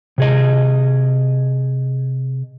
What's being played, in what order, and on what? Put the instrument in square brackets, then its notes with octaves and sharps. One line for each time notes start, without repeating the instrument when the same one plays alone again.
[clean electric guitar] C3 G#4 D#5